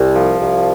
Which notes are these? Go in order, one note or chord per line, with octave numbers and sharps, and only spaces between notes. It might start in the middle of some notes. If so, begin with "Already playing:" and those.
Already playing: C2
F3
C2